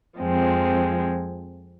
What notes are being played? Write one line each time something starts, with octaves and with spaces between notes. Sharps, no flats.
F2 F3 G#3 C4